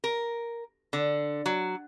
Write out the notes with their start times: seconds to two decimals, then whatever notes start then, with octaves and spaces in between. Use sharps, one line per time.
0.04 A#4
0.93 D3
1.46 F#3